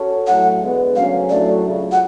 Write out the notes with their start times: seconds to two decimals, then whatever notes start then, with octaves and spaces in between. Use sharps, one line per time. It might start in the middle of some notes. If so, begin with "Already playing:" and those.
Already playing: C#4 F#4 A4
0.26 A2 F#3 A3 F#5
0.61 D2 D3 G#3 B3
0.95 D2 C#3 F#3 C#4 F5
1.30 A2 F#3 A3 D4 F#4 D5
1.64 C#2 C#3 F#3
1.92 F#5